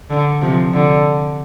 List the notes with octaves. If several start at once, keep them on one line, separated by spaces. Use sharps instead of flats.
D3
C3 F3
D3